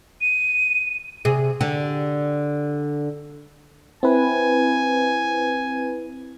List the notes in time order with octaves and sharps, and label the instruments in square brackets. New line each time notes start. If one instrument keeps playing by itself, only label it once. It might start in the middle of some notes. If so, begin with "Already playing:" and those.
[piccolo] D#7
[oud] C3 G#4
D3 G4
[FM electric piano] C4 E4 B4 [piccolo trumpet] G#5